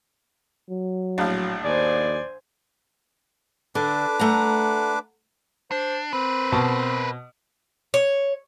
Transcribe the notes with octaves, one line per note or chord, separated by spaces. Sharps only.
F#3
A#1 A2 F5
D#2 C5 D5 G#5
D3 D4 B4 D6
A3 F#5 A#5
D4 C5
C4 A#4 B4
B2 A5
C#5